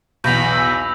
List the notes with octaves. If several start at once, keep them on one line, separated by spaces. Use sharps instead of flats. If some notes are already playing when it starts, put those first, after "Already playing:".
B1 E2 B5 G6 A#6 F7
E6